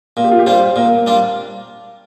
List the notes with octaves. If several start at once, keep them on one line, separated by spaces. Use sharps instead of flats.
A#2 A#4
G4
F4
G4
G3 D4 F4 C5
A#2 A#4
G3 D4 F4